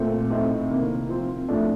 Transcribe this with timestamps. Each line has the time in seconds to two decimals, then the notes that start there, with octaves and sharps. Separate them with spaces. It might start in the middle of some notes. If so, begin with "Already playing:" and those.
Already playing: A#2 A3 C4
0.30 A2 A3 C4 D#4
0.70 C3 D#3 A#3
1.09 F3 C4 F4
1.48 A2 F3 A3 D4